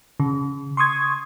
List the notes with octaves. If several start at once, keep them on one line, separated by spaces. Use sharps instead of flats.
C#3
C6 C#6 D#6 G#6